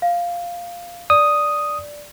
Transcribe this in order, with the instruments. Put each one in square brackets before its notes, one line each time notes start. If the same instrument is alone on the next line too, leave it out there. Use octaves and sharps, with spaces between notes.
[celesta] F5
[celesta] D5 [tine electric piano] D#6